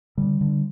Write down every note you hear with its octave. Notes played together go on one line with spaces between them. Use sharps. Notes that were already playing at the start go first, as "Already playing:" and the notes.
D3 G3
D3